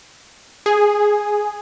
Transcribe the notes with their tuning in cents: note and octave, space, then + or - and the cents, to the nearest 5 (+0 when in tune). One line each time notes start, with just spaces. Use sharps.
G#4 +0